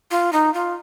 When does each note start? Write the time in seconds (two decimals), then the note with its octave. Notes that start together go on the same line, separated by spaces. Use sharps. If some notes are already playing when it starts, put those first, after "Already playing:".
0.11 F4
0.33 D#4
0.54 F4